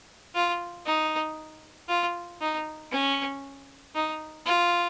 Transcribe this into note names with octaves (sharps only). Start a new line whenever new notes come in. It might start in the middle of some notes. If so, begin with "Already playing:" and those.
F4
D#4
F4
D#4
C#4
D#4
F4